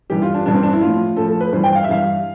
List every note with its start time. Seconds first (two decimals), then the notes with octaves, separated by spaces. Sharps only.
0.10 G2 E3 G3 G4
0.22 F4
0.34 D4
0.45 G2 E3 G3 D4
0.54 C4
0.63 D4
0.73 E4
0.81 A2 F3 F4
1.16 A2 F3 A4
1.28 A4
1.41 B4
1.53 G2 E3 G3 C5
1.64 G5
1.75 F5
1.84 E5
1.88 G2 E3 G3 F5